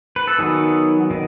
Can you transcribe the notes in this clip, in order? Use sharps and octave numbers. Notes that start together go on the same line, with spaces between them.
B4
A4
D#3 F#3 B3 G#4
D#3